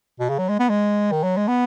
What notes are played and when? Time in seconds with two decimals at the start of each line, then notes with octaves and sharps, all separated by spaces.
0.20 B2
0.29 C#3
0.38 F#3
0.49 G#3
0.59 B3
0.69 G#3
1.12 D#3
1.23 F#3
1.37 G#3
1.48 B3